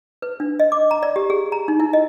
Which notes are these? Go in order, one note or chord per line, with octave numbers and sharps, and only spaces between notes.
B4
D4
D#5
D6
A#5
D5
G4
G#4
A#5
D#4
E4
D#5